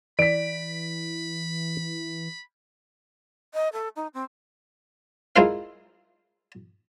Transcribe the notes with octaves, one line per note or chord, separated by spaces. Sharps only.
E3 D5 B5 B6 D7
D#5
A4
D#4
C4
G#3 E4 F4 A#4 C5 F5